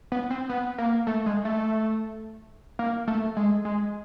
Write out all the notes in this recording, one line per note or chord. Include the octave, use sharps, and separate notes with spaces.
B3
C4
B3
A#3
A3
G#3
A3
A#3
A3
G#3
G#3